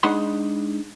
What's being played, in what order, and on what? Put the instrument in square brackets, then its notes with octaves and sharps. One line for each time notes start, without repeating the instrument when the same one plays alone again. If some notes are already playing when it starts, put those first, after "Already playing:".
[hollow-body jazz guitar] G#3 D4 D#4 F#5 B5 C6